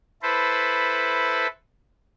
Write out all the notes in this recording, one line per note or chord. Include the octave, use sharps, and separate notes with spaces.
E4 A4 B4 C5